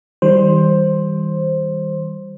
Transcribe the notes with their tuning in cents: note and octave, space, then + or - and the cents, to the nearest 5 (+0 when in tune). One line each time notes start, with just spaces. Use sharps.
D#3 +40 G3 +0 C5 +10